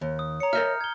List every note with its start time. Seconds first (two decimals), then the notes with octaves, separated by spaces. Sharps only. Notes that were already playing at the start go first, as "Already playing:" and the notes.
0.01 D#2
0.19 D#6
0.40 C#5 A#5 C#7
0.53 A#4 D#5 E5 F6 G6
0.81 G#6 G7